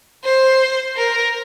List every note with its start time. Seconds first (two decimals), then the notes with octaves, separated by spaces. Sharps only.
0.24 C5
0.97 A#4